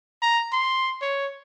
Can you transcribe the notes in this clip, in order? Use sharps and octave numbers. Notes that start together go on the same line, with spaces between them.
A#5
C6
C#5